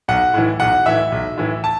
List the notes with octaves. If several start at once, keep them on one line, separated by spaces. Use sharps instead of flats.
B1 F#5
A2 E3
B1 F#5
A2 E3 E5
B1
A2 E3
A5